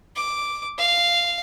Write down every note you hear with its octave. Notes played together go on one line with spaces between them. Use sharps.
D6
F5